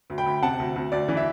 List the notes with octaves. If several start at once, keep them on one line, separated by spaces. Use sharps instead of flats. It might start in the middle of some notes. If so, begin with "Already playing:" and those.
D2
G5 B5
D2
C3 F#5 A5
D2
D2
D2 D5
E3
E5